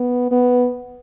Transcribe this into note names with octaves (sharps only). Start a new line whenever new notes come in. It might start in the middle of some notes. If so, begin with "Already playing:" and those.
Already playing: B3
B3